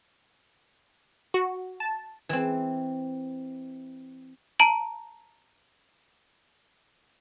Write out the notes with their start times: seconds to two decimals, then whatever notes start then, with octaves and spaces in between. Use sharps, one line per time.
1.34 F#4
1.80 A5
2.29 E3 C4
4.60 A5 A#5 D7 F#7